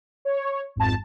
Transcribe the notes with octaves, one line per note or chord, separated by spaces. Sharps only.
C#5
G#1 F2 A5